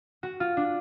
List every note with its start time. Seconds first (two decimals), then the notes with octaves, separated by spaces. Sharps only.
0.23 F#4
0.40 F4
0.57 D4